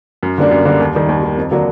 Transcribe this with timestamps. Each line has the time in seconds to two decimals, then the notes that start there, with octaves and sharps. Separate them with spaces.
0.23 F#2
0.38 D3 G3 A#3 D4
0.51 F#2
0.65 D3 G3 A#3 D4
0.80 D#2
0.95 D#3 G3
1.09 D#2
1.23 D#3 G3
1.37 F2
1.51 D3 F#3 A#3 D4